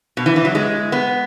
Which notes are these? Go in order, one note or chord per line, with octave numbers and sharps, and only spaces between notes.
B2
E3
E3
F#3
G#3
B3